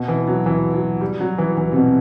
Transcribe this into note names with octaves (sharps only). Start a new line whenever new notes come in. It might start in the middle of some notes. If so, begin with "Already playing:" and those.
Already playing: B2
E3
F#3
E3
F#3
G3
F#3
E3
E3
C3
B2